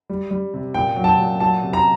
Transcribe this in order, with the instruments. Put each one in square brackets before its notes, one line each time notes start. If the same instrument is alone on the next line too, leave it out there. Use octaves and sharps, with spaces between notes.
[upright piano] G3
G3
C3
A#2 G5
F#3
A5
G5
A#2
F#3 A5
C3
A#5